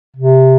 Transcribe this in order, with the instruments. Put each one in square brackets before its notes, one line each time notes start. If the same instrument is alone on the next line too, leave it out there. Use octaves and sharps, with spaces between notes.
[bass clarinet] C3